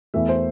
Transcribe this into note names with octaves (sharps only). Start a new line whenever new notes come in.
E2 E3 A3 E5
C5